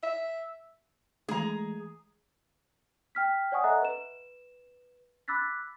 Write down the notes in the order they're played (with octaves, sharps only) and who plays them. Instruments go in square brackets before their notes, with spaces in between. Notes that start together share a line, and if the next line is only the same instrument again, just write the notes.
[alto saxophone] E5
[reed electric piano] E3 G#3 A3 [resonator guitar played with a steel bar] G#4 A#5
[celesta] G5 F6 B6
C#5 D5 F#5 G#5 C#6 D#6
A4 D#5 E5 F#5 A#5 F#6
B4 E7
B5 D6 E6 F#6 A6 B6